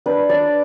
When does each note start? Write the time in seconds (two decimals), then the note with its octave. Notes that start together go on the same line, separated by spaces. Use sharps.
0.06 D4 B4
0.29 D4 D5